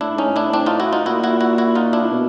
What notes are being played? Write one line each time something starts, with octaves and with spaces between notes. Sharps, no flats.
A2 D4 E4
G#2 C#4 D#4
A2
D4 E4
C4 D4
D#4 F4
E4 F#4
D#4 F4
A#2 E4 F#4
E4 F#4
E4 F#4
E4 F#4
D#4 F4
D4 E4
A#2
B2